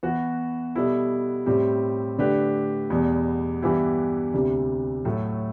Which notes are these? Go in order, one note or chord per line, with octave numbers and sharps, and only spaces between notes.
E3 B3 F#4
B2 G3 B3 E4 A4
A2 G3 C4 G4
D3 A3 D4 G4 B4
E2 B2 G3
G2 E3 B3 E4 G4
D2 C3 G3
A2 F#3 A3